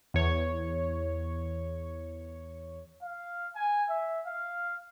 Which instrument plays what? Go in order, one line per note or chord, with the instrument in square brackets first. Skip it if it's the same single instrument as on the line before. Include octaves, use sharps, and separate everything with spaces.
[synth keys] E2 C#5
[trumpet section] F5
G#5
E5
F5